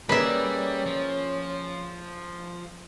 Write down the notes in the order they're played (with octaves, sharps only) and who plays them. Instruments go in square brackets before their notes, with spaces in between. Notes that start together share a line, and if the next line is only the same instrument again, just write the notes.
[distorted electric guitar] G3 [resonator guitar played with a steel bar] A#3 G#4 D5 [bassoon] C#4 [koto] B4 E5
[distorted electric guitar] F3